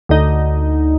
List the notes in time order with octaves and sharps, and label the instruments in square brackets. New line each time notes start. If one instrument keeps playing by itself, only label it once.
[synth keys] D2 D#4